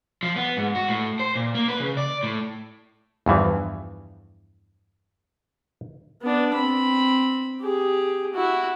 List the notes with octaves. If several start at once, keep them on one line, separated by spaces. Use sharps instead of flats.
F3
B3
G#2
F#4
A2
C5
A#2
A#3
B4
C#3
D5
A2
E2 G2 E3 F3
B3 D4
C4 B5
G4 G#4
E4 F#4